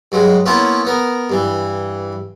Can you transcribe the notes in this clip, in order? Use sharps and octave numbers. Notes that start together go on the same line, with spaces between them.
G2 F#3 G#3
A#3 B3 C#4 E4 F4
B3 A#4
G2 E3